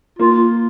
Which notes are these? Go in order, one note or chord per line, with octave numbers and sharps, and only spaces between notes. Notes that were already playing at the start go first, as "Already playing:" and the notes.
A#3 F4